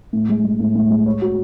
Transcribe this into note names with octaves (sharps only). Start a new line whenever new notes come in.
A2
G#3
G#3
A2
A2
G#3
C#5
F#4